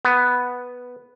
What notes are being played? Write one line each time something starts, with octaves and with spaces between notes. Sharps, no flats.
B3